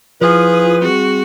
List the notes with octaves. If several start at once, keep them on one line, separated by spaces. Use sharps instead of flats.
F3 E4 F4 G#4 B4 F5
G3 C4 F#4 G#4